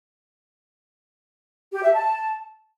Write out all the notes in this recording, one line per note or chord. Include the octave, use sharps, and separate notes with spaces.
G4
E5
A5